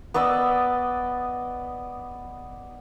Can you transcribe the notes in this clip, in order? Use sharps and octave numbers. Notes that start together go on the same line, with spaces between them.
B3 D5 D#5 E6